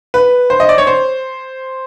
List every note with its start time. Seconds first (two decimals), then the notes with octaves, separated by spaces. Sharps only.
0.14 B4
0.50 C5
0.60 D#5
0.69 D5
0.78 C#5
0.87 C5